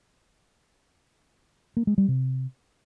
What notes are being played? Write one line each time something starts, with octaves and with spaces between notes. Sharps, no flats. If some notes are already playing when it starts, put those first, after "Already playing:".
A#3
G#3
G3
C3